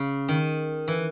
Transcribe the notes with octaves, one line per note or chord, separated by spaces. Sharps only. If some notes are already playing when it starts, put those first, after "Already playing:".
Already playing: C#3
D#3
E3